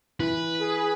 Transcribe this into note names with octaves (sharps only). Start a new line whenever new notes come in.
E3 B4
G#4